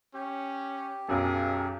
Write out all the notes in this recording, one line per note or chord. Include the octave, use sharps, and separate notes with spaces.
C#4 G4
B1 F#2 G#4